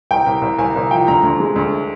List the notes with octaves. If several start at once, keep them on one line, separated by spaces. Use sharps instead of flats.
C2 G5
C2
C2
C2 G#5
C2
F3 G5
D2 A#5
D2
G#3
D2